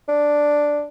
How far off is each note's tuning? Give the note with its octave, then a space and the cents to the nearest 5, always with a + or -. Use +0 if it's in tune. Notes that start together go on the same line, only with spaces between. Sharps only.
D4 +0